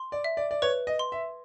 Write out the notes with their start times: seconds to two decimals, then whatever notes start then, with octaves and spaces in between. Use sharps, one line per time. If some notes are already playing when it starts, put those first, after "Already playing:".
Already playing: C6
0.12 D5
0.24 E5
0.37 D5
0.51 D5
0.62 B4 C#5
0.87 D#5
0.99 C6
1.12 E5